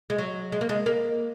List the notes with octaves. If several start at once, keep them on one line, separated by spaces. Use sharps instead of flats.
G#3
F#3
G#3
A#3
G#3
A#3